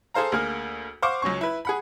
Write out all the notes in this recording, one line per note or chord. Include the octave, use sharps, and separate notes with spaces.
G#4 A4 C5 F5 A#5
D2 A#3 G#4 F6
C5 F5 F#5 C#6 D6
C#2 F#3 C#4 C#6
E4 B4
G#4 F#5 B5